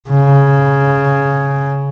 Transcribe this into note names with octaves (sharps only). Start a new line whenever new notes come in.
C#3